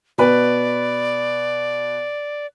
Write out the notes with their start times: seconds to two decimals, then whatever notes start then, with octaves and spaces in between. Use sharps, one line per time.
0.18 B2 B4 D5